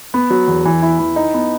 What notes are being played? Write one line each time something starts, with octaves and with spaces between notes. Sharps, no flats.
B3
F#3
E2
E3
E4
E3
D#4
B3